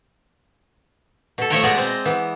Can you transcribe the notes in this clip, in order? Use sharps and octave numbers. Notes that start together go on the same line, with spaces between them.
B2 A4
F3 A3 C#5 E5 G5 A#5
B2 G#3 B3 D5 D#5 A#5
C4
E3 B3